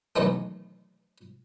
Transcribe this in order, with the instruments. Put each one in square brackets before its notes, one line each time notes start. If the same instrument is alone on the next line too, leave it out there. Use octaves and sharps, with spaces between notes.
[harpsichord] B2 D#3 E3 F#3 G#3 A3